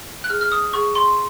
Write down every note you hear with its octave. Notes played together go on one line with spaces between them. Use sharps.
F#6
G#4 F6
F6
D#6
G#4 C#6
C6